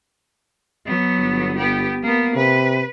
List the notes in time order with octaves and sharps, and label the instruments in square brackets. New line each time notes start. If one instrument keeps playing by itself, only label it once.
[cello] F#3 B3
[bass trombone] G1
[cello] B3 G4
A#3 B3
[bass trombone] C3 [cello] B4